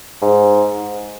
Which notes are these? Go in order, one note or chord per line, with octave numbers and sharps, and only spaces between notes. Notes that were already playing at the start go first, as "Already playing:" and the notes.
G#2